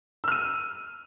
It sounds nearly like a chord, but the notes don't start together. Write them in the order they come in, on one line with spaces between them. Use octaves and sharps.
E6 F6 D#7